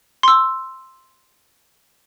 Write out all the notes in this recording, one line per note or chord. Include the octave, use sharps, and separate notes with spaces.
C6 E6